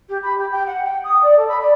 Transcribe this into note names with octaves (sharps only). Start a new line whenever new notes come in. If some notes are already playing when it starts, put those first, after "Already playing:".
G4
B5
G4
G5
F#5
G5
D#6
D5
A4
B5
D5